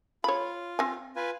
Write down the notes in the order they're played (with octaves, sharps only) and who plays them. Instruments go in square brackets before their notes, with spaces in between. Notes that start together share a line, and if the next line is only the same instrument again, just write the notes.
[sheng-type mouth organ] F4 [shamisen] C#5 B5
[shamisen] C4 G#5
[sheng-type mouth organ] F4 B4 G#5